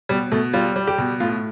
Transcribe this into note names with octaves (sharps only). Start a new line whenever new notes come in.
B2 G3
B2 A3
G3 F4
G3
G4
B2
A2 F4